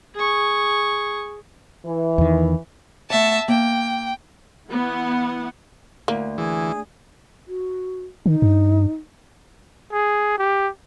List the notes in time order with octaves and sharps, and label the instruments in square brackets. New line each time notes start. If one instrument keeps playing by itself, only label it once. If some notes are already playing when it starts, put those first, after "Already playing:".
[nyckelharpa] G#4 C#6
[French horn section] E3
[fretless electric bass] E2 D#3
[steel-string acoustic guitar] A3 F#5 [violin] E5 A5
[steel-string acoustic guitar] A#3 [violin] G5
[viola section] E3 B3 E4 F#5
[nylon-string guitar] D2 [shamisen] A#3
[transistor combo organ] E3 [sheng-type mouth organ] G#4
[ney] F#4
[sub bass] D#3 [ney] D#4
[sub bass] G2
[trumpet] G#4
G4